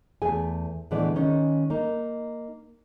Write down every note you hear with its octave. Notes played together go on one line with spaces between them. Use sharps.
E2 A3 G#4 G#5
A2 D3 E3 G#3 B3 D5
D#3 G#3 C#4 D#4
A#3 D#4